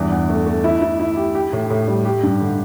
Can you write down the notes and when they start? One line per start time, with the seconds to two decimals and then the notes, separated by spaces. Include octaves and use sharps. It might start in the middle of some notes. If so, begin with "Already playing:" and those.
Already playing: E2 G2
0.12 E2
0.29 A3
0.46 A3
0.64 E4
0.82 E4
1.00 E4
1.17 G4
1.35 G4
1.53 A2
1.70 A2
1.88 G3
2.05 G4
2.23 G2
2.41 D3